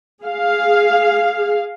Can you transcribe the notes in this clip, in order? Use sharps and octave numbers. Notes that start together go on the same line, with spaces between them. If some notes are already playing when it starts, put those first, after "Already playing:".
G#4 F5